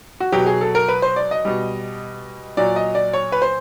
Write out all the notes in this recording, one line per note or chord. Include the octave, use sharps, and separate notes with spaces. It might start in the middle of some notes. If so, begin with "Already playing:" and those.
F#4
B2 F#3 G4
G#4
A4
A#4
B4
C5
D5
D#5
B2 G3
A#2 F#3 D5
D#5
D5
C#5
B4
C5